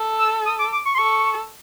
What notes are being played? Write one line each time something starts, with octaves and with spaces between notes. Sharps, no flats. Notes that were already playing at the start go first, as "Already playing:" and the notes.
Already playing: A4
E6
D#6
D6
D6
C#6
C6
A4 C#6